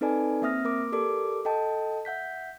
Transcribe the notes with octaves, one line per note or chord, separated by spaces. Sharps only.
C4 D#4 A4 B4 D5 G#5
A#3 C4 E5 D#6 F6 A#6
A#3 A#4 D6
G4 A4 A#4 D5 D6
A4 D#5 G5 A5
E5 F#5 G6 B6